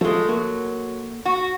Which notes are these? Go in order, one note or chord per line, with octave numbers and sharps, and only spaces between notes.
F3 G#3 A3
F#3 A#3
F#4